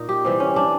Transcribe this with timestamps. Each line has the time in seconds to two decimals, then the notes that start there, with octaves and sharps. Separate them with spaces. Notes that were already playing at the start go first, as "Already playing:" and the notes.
Already playing: A#2 D#4
0.09 G4
0.25 C3 E3 G3
0.40 C#4
0.56 D4